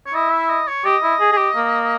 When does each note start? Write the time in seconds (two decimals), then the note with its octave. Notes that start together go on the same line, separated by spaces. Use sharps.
0.06 C#5
0.14 E4 D#5
0.32 E5
0.50 D#5
0.68 C#5
0.84 G4 D#5
1.03 E4
1.20 G#4
1.32 G#4
1.37 G4
1.56 A#3